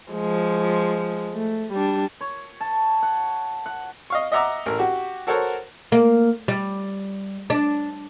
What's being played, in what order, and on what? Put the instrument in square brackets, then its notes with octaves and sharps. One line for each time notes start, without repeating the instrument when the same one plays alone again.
[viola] F3 G#3
A3
G3 D4
[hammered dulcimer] C#5
A5
F#5
F#5
[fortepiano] D#5 F5 C#6
D#5 E5 F#5 A#5 D6 E6
A1 A#4
F#4 G4
F#4 A4 A#4 C5 C#5 F#5
[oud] A#3
G3
D4